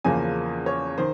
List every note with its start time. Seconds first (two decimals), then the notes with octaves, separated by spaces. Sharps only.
0.04 E2 C#3 F3 A#3 G#5
0.66 C#5
0.98 D#3 C5